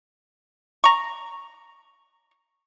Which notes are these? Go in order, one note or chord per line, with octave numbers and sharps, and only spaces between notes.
A#5 C#6